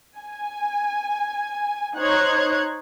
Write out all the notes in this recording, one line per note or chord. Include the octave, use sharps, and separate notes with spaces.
G#5
D#4 C5 C#5 F#6 G#6